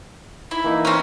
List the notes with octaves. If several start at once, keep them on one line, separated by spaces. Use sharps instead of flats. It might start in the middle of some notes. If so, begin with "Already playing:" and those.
E4
E3 A#3 D#4
C4 C#4